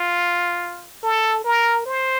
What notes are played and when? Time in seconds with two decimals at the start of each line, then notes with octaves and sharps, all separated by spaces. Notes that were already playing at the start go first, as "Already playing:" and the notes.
Already playing: F4
1.03 A4
1.44 A#4
1.86 C5